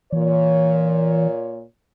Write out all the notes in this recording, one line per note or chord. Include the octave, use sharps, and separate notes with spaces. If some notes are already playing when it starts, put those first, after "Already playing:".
A#2 E3 C#5